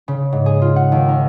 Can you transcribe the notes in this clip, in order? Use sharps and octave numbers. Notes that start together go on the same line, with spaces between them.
C#3
G#2
G#4
F4
F#5
D#2
A#4